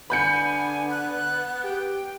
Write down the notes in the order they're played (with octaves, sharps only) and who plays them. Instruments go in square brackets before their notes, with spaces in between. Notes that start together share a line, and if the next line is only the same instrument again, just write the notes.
[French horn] D3 [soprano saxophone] B3 [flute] G#5 [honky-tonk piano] B5 G6 C#7
[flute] F#6
[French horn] G4 [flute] G5